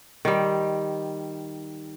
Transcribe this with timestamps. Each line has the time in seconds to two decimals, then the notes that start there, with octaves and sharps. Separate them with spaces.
0.25 D#3 G3